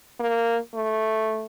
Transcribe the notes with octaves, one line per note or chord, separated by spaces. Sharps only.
A#3
A3